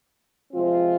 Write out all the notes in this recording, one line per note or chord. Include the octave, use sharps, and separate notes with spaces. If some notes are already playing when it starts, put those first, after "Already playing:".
C3 F3 G#3 C4 F4